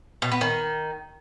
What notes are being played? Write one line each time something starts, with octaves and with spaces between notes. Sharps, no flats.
B2
B3
D#3